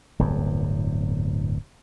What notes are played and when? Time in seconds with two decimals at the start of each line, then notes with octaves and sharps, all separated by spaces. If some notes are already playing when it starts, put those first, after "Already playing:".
0.19 D1 G1 E2